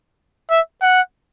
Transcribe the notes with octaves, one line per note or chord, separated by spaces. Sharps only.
E5
F#5